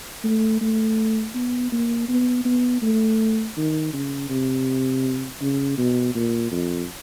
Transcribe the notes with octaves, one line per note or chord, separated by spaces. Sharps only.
A3
A3
B3
A#3
B3
B3
A3
D#3
C#3
C3
C#3
B2
A#2
F2